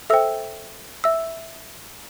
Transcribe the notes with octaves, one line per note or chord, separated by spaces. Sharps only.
A4 C5 E5 G5 E6
E5 E6